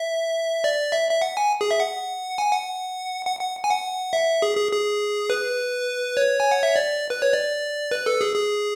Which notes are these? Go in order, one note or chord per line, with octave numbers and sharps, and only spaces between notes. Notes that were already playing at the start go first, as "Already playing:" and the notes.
Already playing: E5
D5
E5
E5
F#5
G#5
G#4
E5
F#5
G#5
F#5
F#5
F#5
G#5
F#5
E5
G#4
G#4
G#4
B4
C#5
G#5
F#5
E5
D5
B4
C#5
D5
B4
A4
G#4
G#4